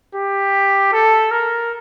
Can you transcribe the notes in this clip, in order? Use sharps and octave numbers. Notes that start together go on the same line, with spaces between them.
G4
A4
A#4